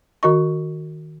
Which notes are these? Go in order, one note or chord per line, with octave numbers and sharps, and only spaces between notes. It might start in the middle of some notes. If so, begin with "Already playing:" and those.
D#3 F#4 D#5 C#6